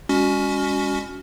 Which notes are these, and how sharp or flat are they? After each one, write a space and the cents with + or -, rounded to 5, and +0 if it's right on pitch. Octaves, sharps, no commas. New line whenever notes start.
G#3 -45 C#4 +25 F#4 +0